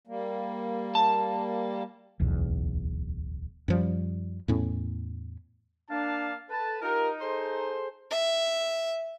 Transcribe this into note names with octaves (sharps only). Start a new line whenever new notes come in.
G3 A#3
A5
D1 B1 E2
F#2 F3 G3
E2 A2 C#4
A#3 D4 F5 A5
A4 B4 A5
D#4 F4 G4 A#4
G#4 A4 C5
E5